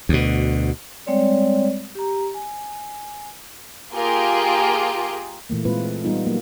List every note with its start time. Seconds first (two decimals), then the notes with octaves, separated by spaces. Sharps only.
0.09 D2 B2
1.07 G3 G#3 C4 C#5 D5
1.95 G4 A#5
2.34 G#5
3.93 A#3 F4 G4 G#4 A#4
5.50 A#2 E3 A3 A#3
5.65 A#2 G#3 C4 F4 B4
5.85 A4
6.04 G3 B3 D#4 F4
6.26 F#3 A#3